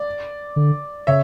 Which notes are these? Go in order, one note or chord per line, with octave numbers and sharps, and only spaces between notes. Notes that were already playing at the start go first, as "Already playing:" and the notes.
Already playing: D5
D3
C#3 C#5 E5